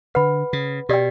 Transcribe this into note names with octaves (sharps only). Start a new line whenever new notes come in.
D3 B4 F#5 B5
C#3
B2 G4 D5 G5